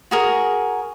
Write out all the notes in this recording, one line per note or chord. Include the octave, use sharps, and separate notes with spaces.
F#4 G#4 A#4